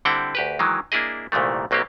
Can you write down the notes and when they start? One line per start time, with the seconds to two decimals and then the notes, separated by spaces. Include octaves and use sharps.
0.05 D3 G3 C4 E4 F#5 G5
0.35 D2 G4 B4
0.59 D#3 E3 F#3 G#3
0.92 A#3 D4 E4 G#4 D#5
1.32 C2 A#2 D#3 E3 A3
1.71 B1 F#3 A#3 C4 G4